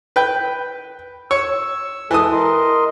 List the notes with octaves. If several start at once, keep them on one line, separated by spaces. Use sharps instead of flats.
B4 G5
C#5 E6
E3 G#3 A4 D#6
A#4 D#5 C6